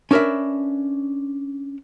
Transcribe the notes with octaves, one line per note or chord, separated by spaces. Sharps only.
C#4 D4 A#4 B4 E5